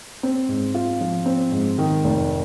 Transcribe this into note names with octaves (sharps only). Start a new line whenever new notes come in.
C4
G#2
F4
F3
C4
G#2
D#3
F1